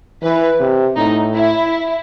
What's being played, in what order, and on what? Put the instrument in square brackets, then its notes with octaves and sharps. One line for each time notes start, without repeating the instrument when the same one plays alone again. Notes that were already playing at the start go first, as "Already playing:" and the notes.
[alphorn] E3 [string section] B4
[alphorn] C3
[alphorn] A2 [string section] D#4
[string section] E4